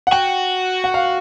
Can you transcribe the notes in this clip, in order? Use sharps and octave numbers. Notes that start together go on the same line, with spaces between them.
F#5
F#4 G5
F#5
F5